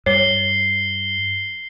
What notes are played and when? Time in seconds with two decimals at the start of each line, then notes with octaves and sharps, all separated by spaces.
0.06 G2 C#5 C7 G7